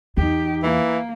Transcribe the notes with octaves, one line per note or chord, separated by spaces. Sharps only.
E2 D#4 G4
E3 A#3